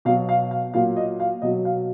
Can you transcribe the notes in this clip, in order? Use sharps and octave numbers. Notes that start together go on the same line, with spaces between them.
B2 F#3 F5
F5
F5
A#2 F#3 F5
D#5
F5
B2 F#3 D#5
F5